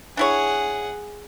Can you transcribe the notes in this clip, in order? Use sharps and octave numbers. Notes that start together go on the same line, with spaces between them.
D4 E4 G#4 C#5 F#5